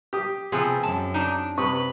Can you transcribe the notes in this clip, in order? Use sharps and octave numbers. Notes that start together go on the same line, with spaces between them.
G4 D#6
C3 F3 B3 C4 G#4
F#2 A5
D4 D#4
C3 B4 C#6 D#6